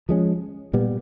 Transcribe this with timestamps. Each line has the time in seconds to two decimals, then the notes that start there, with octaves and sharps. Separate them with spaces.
0.09 F3 G#3 C#4
0.73 A#2 G3 B3